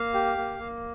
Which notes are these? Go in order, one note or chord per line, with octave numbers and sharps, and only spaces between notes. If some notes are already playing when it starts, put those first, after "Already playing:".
Already playing: A#3 F5
G4
A#3
A#3